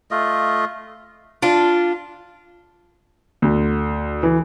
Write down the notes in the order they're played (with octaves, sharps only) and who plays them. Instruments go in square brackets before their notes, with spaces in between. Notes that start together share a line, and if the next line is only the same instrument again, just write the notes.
[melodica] A3 F4 D#5
[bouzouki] D4 F4
[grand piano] D2
E3